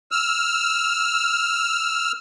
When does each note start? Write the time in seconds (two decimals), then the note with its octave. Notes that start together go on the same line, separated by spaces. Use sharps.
0.11 E6 F6